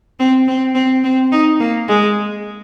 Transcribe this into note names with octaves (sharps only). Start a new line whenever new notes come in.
C4
C4
C4
C4
D#4
A#3
G#3